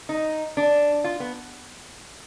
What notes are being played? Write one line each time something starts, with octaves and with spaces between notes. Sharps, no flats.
D#4
D4
F4
B3